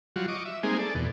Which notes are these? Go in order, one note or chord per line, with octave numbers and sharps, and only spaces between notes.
F#3 G3 F4 F#4
D#5 C#6 D6
E5
G3 G#3 A#3 C4 D#4 G#4
A4 D5
E2 B2